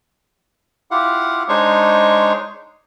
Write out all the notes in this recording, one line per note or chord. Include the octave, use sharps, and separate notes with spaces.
E4 F4 G4 F5 F#5
G#3 D4 D#4 C5 C#5 C#6